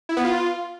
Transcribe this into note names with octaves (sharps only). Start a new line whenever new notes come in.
E4
B3
F4